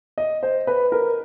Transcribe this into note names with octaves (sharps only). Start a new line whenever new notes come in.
D#5
C5
B4
A#4